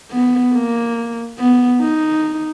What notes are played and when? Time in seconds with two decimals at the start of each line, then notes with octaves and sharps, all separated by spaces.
0.11 B3
0.54 A#3
1.38 B3
1.81 D#4